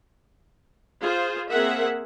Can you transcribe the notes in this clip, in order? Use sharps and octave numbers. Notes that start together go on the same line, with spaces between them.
F4 G#4 C5
A#3 C4 G#4 A#4 E5 F#5